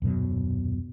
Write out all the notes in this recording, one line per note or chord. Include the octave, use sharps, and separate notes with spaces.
D#1 F#2 B2 F#3